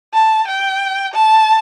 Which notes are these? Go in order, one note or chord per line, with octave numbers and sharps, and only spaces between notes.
A5
G5
A5